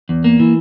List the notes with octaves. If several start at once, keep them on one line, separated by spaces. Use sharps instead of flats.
E2
A#3
E3